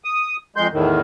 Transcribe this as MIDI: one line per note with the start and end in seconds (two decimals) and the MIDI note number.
0.04 0.36 87
0.56 0.67 41
0.56 0.67 56
0.56 0.67 84
0.56 0.67 91
0.73 1.01 40
0.73 1.01 45
0.73 1.01 51